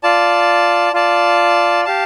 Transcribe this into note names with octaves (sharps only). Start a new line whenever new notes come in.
F4 D5 A5
F4 D5 A5
G4 F5 A5